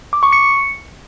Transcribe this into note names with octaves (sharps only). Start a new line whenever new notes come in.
D6
C#6
C#7